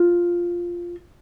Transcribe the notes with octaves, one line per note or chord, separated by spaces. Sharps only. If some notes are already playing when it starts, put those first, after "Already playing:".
Already playing: F4